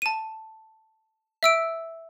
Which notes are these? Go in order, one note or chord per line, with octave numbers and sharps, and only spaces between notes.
A5 D#7
E5 E6 D7